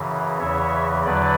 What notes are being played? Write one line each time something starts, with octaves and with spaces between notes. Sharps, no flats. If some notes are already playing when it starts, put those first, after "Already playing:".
Already playing: F#2 C#3 E3
E2 C#3 E3 C#5 E5
E2 D3 F#3 B4 D5